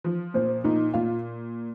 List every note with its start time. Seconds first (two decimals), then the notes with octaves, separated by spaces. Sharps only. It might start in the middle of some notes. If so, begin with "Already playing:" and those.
0.04 F3
0.34 A#2 C5
0.64 A#2 D#4
0.94 A#2 F4